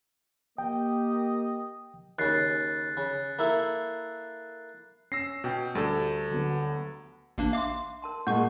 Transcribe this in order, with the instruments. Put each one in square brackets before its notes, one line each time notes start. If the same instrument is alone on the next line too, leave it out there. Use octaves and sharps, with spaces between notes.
[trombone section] A#3 G4 [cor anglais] D#5 [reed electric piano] G5
[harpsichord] D#2 C#3 [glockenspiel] F#6 A6 C7
[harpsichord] C#3
A#3 E4 A4
[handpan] C#4 [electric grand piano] E6 A#6 C7
[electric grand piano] B2 G5
[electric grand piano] D2 A4 [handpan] G3
[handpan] D3 F#3 B3
[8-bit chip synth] A1 A#3 D4
[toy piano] E5 C6 [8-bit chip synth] F5 D6
[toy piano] A#4 A5 C6
[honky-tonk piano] A#2 G#3 [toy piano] F#5 A5 [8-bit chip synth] C#6 G6